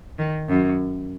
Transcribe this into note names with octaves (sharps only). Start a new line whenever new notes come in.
D#3
F#2